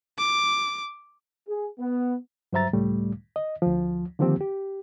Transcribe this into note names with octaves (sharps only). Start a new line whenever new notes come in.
D6
G#4
B3
G2 F#3 C5 E5 A#5 A6
C#2 A2 G3 A3
D#5
D2 F3
D3 D#3 F3 A#3 C4 G4
G4